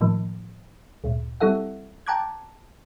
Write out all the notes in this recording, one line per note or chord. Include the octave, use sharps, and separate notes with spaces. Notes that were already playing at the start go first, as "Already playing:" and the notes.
A2 D#3 F3 A#3
D2 G2 A#2
G3 C4 E4 A4 E5 F#5
G5 A5 A#5 D6 F#6 G#6